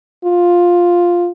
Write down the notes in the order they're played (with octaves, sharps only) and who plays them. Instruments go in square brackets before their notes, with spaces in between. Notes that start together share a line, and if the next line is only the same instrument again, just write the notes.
[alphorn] F4